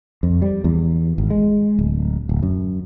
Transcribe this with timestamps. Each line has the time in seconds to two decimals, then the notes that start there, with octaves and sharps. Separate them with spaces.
0.23 F2
0.42 G3
0.64 E2
1.18 G#1
1.30 G#3
1.79 D1
2.29 D1
2.43 F#2